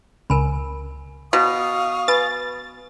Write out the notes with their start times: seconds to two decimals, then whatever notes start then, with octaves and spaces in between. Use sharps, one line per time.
0.30 C#2 A#4 G#5 B5
1.33 B2 F5 C#6 D#6
2.08 B4 G#5 B5 A6